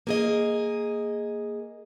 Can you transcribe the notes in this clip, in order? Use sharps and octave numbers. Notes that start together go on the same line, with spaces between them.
A#3 G#4 D#5